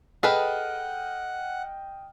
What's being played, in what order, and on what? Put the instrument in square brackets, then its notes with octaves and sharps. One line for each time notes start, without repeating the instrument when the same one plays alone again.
[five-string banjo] G#4 A4 B4 [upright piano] D#5 G5 F6 [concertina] F#5